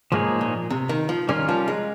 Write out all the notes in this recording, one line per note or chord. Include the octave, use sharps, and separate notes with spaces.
G#2 F3 A#3 D#4 G#4 C#5
A#2
C3
D#3
F3
D#3 G3 C#4 F4 A#4
F3
G#3